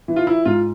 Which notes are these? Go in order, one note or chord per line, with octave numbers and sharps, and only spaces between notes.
E3
F4
E4
G#2 F4